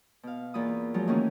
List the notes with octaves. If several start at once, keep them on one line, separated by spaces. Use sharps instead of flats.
B2 F5
E2 A#3 F4 B5 D#6
F3 F#3 G#3
D#3 E3 A3 A#3 C#4